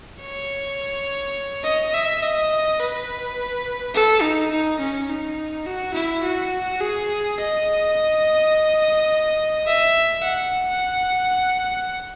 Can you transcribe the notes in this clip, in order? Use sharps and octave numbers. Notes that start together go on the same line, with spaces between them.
C#5
D#5
E5
D#5
B4
A4
D#4
D#4
C#4
D#4
F#4
E4
F#4
G#4
D#5
E5
F#5